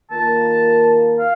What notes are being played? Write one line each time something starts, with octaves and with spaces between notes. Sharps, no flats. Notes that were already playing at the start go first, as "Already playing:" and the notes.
D#3 A#3 F4 A#4 A5
F5